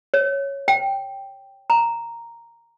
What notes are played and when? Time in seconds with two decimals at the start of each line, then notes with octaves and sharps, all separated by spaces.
0.14 C#5
0.68 G5
1.70 A#5